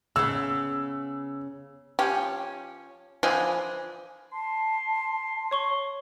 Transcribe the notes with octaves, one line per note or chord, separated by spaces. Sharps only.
C#3 B3 E6
F3 C#4 G4
D3 E3 F3 G#4
A5 C6
C#5 C#6 G7